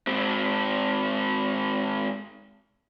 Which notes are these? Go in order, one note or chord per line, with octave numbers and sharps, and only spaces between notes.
G#2 C4